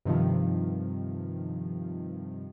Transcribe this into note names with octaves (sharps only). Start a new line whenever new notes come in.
G2 C3 D#3 F3